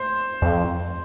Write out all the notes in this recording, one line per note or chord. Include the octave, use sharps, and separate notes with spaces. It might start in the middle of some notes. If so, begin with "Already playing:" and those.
Already playing: C5
F2